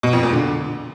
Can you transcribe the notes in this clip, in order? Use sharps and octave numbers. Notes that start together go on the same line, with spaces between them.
B2
F2
A#2
D3